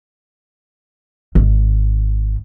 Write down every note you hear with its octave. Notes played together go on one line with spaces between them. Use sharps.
G#1